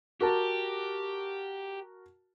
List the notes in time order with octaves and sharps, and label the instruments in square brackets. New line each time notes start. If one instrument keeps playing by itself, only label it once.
[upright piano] F#4 A#4 A5 [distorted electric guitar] G4